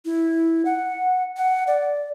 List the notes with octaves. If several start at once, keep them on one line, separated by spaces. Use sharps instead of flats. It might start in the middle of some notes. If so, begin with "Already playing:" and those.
E4
F#5
F#5
D5